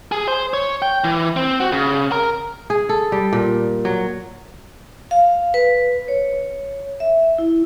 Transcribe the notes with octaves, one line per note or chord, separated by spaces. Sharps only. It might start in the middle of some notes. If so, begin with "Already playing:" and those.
G#4
C5
C#5
G5
E3
C4
F#4
C#3
A#4
G#4
A4
G3
A#2
F#3
F5
B4
C#5
E5
E4